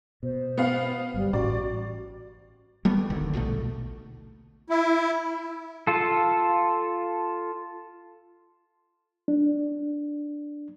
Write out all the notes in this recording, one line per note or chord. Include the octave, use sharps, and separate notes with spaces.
B2 C5
B3 F5
G1 G3
A1 A2 C#4 F#4 D5
G3 A3 B3
F1 D2 D3 D#3
A#1 B2 D#3 A3
E4
F4 A4
D4